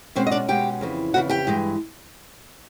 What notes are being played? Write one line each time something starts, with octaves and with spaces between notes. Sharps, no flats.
B2 G#3 C4 C#4 C5
D#5
D4 D5
B2 G#3 C#4 G4 G5
F2 C#3 E3
F2 C#3 E3 F#4 F#5
G4 G5
G2 E3 G#3